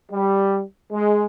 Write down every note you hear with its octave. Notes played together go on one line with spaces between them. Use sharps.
G3
G#3